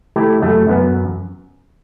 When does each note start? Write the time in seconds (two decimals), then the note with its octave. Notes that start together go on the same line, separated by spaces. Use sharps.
0.16 A3 E4 G4
0.42 F#2 A3
0.68 F#2 B3